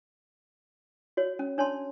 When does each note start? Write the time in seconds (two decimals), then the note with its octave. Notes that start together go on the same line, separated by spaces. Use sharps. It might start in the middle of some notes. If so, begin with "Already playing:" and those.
1.17 F#4 C#5
1.39 C#4
1.58 D4 C#5 A5 C6